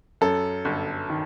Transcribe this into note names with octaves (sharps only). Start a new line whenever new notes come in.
F#2 A4
G1
D#3